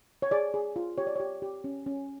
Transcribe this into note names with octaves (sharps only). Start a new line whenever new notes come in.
C#5
G#4 D5
G#4
F4
G4 C#5
D5
G4 C#5
G4
C#4
C#4